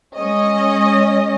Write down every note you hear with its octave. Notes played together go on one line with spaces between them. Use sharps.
G#3 C#4 D#5